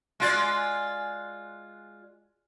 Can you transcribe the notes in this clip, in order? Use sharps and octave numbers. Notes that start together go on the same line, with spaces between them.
G#3 F4 D5